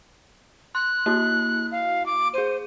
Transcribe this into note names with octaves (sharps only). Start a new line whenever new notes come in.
C6 F#6
A#3 E4 F#4
F5
D6
G#4 C5 D#7